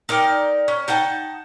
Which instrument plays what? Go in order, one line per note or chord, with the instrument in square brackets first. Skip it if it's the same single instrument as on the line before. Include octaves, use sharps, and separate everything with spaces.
[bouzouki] D#4 A#4 D5 G5
C#4
D#4 F#5 G5 A5